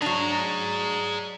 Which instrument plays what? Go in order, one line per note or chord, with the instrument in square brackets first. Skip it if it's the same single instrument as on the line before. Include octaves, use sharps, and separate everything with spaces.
[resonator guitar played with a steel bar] F#3 D4 [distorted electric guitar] G#4 A#5